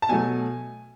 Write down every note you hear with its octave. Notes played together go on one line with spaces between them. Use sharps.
A5
B2 F#3 A3 G#5